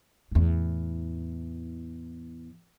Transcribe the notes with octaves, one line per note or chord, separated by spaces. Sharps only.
E2 A2